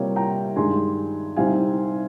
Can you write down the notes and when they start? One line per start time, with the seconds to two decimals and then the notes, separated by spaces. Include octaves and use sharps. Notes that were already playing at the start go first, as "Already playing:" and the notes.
Already playing: C3 G3 A#3 F4 A#4 C#5
0.16 G5 A#5
0.56 G2 D#3 G#3 D#4 G#5 C6
1.36 C2 C3 G3 C4 D#4 F5 G#5